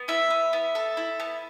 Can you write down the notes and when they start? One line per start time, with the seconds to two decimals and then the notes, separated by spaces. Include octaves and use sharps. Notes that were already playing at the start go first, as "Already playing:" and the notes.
Already playing: B3
0.08 E4 E5
0.30 B3
0.53 B3
0.75 A4
0.97 E4
1.20 B3